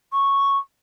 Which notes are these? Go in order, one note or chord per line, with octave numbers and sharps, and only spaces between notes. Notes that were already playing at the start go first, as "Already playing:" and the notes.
C#6